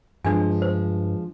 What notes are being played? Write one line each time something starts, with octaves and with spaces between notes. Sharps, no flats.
G2 F3 G#3 D4 G#5
C5